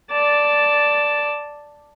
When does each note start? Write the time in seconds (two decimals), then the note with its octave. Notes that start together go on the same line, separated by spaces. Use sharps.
0.12 D5 A5